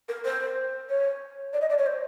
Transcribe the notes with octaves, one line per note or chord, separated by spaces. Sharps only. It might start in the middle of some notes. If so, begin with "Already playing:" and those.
A#4
C5
C#5
D5
D#5
D5
C#5
C5